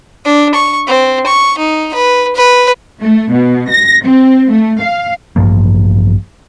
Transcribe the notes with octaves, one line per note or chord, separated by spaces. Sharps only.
D4
C#6
C4
C#6
D#4
B4
B4
A3
B2
A#6
C4
A3
F5
A1 G2 F3 A#3